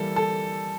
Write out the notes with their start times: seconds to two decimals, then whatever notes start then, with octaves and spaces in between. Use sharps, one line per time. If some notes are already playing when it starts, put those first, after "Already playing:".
Already playing: E3 G3 A#3 A4
0.16 A4